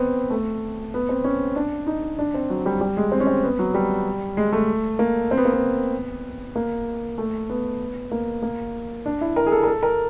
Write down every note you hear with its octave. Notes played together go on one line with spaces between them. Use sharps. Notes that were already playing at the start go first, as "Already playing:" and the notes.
Already playing: B3 C4
A3
B3
C4
C#4
D4
D#4
D4
C4
F#3
G3
G3
G#3
C4
C#4
C4
B3
F#3
G3
G#3
A3
A#3
C4
B3
A#3
B3
A#3
A3
B3
A#3
A#3
D4
E4
A#4
G#4
A4
A#4
A4
A#4